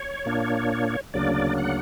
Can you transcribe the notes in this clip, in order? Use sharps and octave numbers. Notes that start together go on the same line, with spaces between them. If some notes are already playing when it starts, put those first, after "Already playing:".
Already playing: C#5
A#2 A#3 D4
D2 C#3 F#3 A#3 D4 D5
F#5